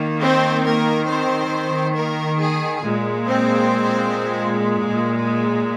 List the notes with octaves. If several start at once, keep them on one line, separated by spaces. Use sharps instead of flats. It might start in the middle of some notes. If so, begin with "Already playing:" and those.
Already playing: D#3 A#3
C4 C5
A#3 A#4
C4 C5
A#3 A#4
G#4
A#2 G#3
C4 C5